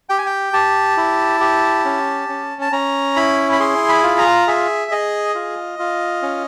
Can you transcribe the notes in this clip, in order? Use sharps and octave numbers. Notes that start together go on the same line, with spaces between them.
G4 G5
G#5
G5
G4 A5
E4
G4
C#4
C#4
A5
C#4 A#5
E4 B5
B5
G#4 C6
B5
F4
A#5
G#4 E5
G#4 D#5
F4
F4
C#4